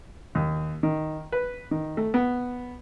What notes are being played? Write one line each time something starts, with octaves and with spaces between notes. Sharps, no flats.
D#2
D#3
B4
D#3
A3
B3